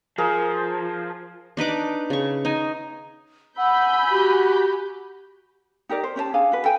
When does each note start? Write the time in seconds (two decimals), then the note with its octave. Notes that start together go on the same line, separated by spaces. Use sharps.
0.18 F3 G#4 A#4
1.57 D4 D#4 B4 D6
2.10 C#3 C#6
2.45 D#4 G#5
3.58 F#5 G#5 B5 E6 G6
4.11 F#4 G4
5.89 D#4 G4 A#4 D5
6.04 C5
6.16 C#4 G4 D5 A5
6.34 D4 G#4 F5 G#5
6.52 F#4 B4
6.65 A4 G5 G#5